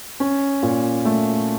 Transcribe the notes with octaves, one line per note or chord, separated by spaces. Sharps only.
C#4
A#2
A3